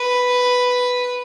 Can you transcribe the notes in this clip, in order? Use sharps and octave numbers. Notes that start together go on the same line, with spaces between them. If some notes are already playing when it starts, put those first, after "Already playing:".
Already playing: B4